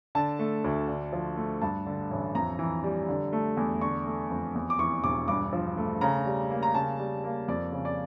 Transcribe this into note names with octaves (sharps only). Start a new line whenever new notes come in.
D3 A5
A3
D2
D3
F3
A3
G2 A5
D3
A1
F2 A#5
E3
G3
D3
A3
E2
D3 C#6
A3
F2
E2
D6
E3 C#6
E1 D6
G2 D6
F3
A3
C#3 A#5
G3
A#3
A#5
C#3 A5
G3
A#3
F2 D5
C#3
D5